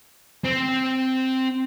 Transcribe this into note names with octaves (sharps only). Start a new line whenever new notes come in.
C4